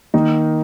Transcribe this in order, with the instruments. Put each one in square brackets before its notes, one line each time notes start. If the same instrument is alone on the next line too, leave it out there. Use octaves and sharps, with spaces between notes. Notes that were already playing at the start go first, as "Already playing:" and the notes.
[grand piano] D#3 A#3 D#4